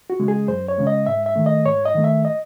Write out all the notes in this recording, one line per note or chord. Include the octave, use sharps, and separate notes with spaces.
F#4
C#3 G#3
G#4
F#2 C5
C#5
C#3 G#3
D#5
G#2 E5
E5
D#3 A3
D#5
G#2 C#5
D#5
D#3 A3
E5
D#5